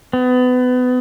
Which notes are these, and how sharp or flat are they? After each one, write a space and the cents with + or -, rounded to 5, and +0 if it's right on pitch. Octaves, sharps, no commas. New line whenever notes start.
B3 +25